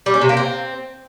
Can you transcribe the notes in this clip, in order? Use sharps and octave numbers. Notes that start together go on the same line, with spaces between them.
G3
C#4
C3
A#3
C4